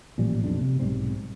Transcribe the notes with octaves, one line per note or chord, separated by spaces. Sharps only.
A1 A#2 F3 G3
B1 F2 G3 D4
C3
B1 G#2 G3 C4